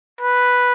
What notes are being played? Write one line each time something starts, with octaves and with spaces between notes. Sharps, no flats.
B4